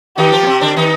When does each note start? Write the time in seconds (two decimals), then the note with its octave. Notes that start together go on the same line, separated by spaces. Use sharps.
0.17 D#3 D#4 G4
0.32 F3 F4
0.43 A#3
0.47 C3 C4
0.61 D3 D4
0.77 D#3 D#4